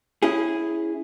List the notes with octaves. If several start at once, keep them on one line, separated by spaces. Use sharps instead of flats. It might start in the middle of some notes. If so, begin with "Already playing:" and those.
C#4 E4 G#4